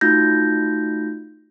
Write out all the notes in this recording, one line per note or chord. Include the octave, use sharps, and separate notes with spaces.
A3 D#4 F4 F#4 G6 A#6